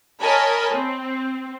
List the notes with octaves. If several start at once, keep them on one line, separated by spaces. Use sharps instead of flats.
A#4 C#5 D#5 G#5 A5 B5
C4